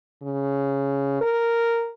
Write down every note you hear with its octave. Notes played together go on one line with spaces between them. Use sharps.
C#3
A#4